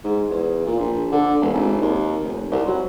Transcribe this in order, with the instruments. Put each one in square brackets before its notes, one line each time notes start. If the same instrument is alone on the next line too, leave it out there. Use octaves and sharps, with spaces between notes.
[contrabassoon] G#2
E2
A#2
A#1
D3
E1
G#1
D#2
F1
C2
F#3